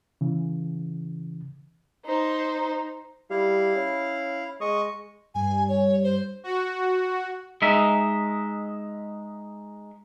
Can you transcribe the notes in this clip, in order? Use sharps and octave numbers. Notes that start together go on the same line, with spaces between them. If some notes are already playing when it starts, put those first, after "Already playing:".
C#3 E3
D#4 C5
G3 E4 F5
C#4
G#3 D#5 C#6 D#6
G2 G3 G#5
C#5
C5
F#4
G#3 D#4 E5